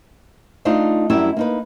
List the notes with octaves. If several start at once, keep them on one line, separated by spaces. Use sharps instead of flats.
A3 D4 D#4 F4
F#2 G3 E4 A#4 E5
A#3 D#4 B4